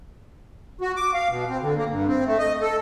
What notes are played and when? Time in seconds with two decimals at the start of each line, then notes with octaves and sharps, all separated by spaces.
0.81 F#4
0.96 D6
1.14 F5
1.29 B2
1.49 C4
1.61 D3
1.76 A#3
1.89 G2
2.07 C4
2.26 A3
2.38 D#5
2.61 A4